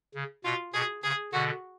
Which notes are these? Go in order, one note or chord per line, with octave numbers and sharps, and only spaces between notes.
C#3
B2 F4
B2 G#4
C#3 G#4
B2 D3 F#4